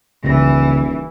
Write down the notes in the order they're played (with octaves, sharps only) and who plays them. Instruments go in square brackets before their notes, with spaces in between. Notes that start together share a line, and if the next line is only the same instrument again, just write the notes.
[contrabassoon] D#1 [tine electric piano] C#2 C#3 [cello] E3